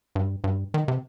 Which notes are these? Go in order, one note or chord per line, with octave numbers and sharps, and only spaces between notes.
G2
G2
D#3
C3